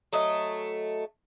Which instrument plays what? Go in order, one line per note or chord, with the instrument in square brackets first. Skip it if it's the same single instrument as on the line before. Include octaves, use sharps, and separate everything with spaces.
[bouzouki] F#3 A3 D#5